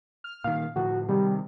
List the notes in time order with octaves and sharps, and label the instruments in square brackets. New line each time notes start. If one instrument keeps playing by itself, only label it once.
[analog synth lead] F6
[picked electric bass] A#2 D#3 [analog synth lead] F5
[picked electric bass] A2 D3 F3 [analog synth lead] F#4
[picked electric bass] C3 D#3 [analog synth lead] G3